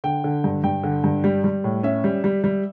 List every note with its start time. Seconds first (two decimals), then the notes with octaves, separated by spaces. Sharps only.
0.04 D3 G5
0.24 D3
0.44 G2
0.64 G2 G5
0.84 D3
1.04 G2
1.24 G3
1.44 G3
1.64 A2
1.83 C#4 E5
2.04 G3
2.24 G3
2.44 G3